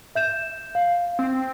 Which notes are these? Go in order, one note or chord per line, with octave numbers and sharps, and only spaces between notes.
E5 G6 E7
F5
C4